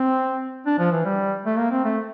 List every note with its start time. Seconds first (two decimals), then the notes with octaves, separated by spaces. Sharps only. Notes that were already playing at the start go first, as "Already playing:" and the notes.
Already playing: C4
0.66 D4
0.79 F3
0.92 E3
1.05 G3
1.45 A3
1.58 A#3
1.71 C4
1.84 A3